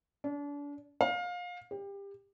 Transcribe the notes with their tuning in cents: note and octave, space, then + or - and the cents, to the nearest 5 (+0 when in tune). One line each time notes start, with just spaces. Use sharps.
D4 -35
F5 +25
G4 +25